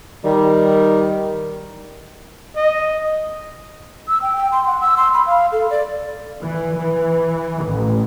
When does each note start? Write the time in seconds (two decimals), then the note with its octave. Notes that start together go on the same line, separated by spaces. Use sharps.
0.24 D#3 G3
2.56 D#5
4.08 E6
4.22 G5
4.35 G5
4.52 C6
4.67 F#5
4.81 E6
4.97 C6
5.14 B5
5.26 F5
5.52 A4
5.70 D5
6.43 E3
6.77 E3
7.64 A1